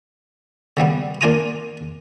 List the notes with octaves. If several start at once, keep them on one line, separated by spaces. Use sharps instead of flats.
C#3 F#3 G3 B3
A#3 D4 F4 G#5 A#5 D#6